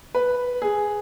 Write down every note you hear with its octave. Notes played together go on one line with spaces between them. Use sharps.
B4
G#4